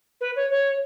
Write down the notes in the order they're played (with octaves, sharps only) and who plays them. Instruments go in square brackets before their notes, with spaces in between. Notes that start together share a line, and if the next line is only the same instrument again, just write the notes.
[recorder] B4
C#5
C#5